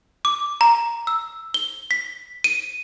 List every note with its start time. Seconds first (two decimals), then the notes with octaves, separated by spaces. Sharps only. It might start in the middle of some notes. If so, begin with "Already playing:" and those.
0.25 D6
0.61 A#5
1.07 E6
1.54 G7
1.91 B6
2.44 D#7